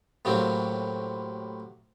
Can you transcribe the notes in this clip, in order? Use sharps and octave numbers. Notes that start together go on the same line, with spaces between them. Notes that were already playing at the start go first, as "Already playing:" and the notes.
A2 C3 F#3 A#3 C4